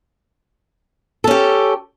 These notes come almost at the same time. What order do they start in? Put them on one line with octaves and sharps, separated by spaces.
A4 C#4 G4